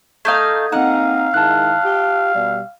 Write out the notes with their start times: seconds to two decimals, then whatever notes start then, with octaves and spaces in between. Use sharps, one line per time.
0.25 A3 D#4 F5 D#6 G6 G#6
0.72 A#3 C4 D#4 F5 F#5 A#5
1.34 D#3 G#3 E4 A5 F#6
1.84 F4 G4
2.35 B2 G3